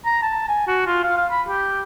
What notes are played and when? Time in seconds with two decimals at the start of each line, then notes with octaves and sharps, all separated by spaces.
0.05 A#5
0.22 A5
0.48 G#5
0.68 F#4
0.87 F4
1.03 F5
1.18 F5
1.31 B5
1.49 G4